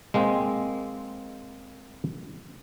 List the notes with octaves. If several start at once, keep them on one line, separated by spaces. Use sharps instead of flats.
G#3 A#3 C4